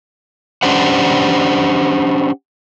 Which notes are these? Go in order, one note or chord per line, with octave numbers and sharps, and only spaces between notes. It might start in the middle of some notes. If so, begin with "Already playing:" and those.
C#4 D4 G4 C5 F#5